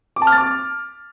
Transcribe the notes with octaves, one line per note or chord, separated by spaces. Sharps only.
D6
A5
F6
A6
D6